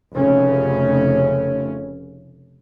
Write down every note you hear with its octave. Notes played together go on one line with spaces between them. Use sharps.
F1 C#3 A3 C#4